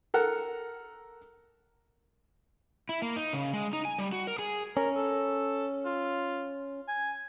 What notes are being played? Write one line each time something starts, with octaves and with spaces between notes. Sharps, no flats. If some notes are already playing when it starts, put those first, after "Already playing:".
A4 A#4 F#5
E4
A#3
D#4
C#3
G#3
D#4
G#5
G3
F#4
A#4
G#4
C#4 A#4
A4
F4
G#5